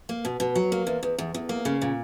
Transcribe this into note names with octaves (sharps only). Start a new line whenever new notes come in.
A#3
B2
B2
F#3
A#3
E2
E2
E2
E2
A#3
C#3
A#2